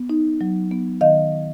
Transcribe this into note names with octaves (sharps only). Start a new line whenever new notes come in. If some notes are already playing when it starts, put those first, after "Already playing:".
Already playing: B3
D#4
F#3
B3
D#3 D#5 F5